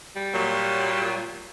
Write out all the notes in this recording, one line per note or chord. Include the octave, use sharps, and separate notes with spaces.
G3
A#2 F#3